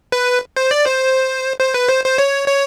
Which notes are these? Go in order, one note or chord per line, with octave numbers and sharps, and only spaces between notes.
B4
C5
D5
C5
C5
B4
C5
C5
C#5
C#5